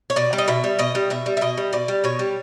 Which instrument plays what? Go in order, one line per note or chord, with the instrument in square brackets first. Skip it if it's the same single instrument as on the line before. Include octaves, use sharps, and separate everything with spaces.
[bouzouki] C#5
B2 D5
G3
D#5
B2 E5
G3
B2 D#5
G3
B2 E5
G3
E5
B2 D#5
G3
B2 D5
G3
B2 C#5
G3